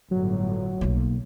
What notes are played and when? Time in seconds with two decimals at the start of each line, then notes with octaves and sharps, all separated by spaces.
0.11 G1 A2 D3 F#3
0.81 B1 A#3